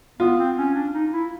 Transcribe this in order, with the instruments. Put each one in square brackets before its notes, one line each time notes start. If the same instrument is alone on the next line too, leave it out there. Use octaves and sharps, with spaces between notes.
[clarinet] B3 [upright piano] F4
[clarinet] C4
C#4
D4
D#4
E4